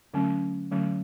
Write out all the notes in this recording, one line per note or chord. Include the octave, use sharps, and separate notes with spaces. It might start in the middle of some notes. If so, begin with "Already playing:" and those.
D3 F#3 A3 C#4
D3 F#3 A3 C#4